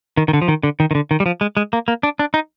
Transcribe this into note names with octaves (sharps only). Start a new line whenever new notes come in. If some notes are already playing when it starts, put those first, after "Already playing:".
D#3
D#3
D3
F3
D#3
D3
D#3
D#3
D3
D#3
G3
F3
G#3
G#3
A#3
A#3
D4
D4
D#4